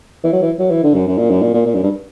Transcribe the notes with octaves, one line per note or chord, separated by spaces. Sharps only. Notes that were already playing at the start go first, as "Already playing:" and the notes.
E3
F#3
E3
F#3
E3
D3
F#2
F#2
A#2
F#2
A#2
A#2
A#2
F#2
G2